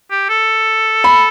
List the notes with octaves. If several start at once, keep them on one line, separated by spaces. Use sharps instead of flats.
G4
A4
B5